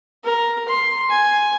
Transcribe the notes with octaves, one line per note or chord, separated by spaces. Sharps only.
A#4
C6
G#5